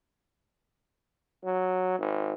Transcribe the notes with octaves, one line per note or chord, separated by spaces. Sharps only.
F#3
G#1